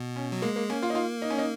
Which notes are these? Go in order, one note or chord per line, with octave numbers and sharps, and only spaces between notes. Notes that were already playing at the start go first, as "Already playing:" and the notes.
Already playing: B2
C#4
F#3
G#3 A#3
A#3
A#3 C#4
F4
D#4
F4
D#4
C#4
D#4